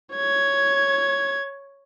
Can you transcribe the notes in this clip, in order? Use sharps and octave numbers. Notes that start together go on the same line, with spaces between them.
C#5 G#6